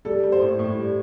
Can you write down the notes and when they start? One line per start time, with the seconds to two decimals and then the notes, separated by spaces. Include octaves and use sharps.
0.05 G3 A4
0.23 G3
0.32 C5
0.41 A2
0.59 A2
0.78 G3